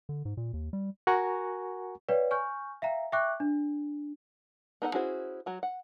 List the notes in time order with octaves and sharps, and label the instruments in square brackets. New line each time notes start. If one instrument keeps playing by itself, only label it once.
[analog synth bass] D3
G#2
A#2
D#2
G3
[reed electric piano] F#4 A#4 F#5 G#5 A#5 C#6
[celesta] B4 C#5 D5 F5 G5
G#5 C#6 F6 G6
E5 F5 G5 A#5
E5 G5 C#6 D6 F#6
D4
[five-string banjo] B3 D#4 A4 E5 F#5
C#4 E4 F#4 G#4 C5
F#3 F#4
F#5